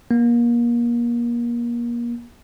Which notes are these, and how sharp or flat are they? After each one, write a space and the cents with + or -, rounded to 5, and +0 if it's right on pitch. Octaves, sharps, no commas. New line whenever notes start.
A#3 +30